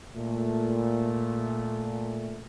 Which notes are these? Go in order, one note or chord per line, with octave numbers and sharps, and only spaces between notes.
A#2 A3